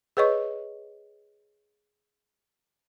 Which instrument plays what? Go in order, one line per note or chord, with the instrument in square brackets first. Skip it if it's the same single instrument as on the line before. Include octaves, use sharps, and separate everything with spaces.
[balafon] G#4 B4 C#5 D#5 C#6